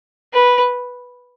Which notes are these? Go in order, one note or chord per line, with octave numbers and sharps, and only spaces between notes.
B4